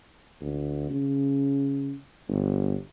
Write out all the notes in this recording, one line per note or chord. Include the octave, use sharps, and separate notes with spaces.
D2
C#3
G1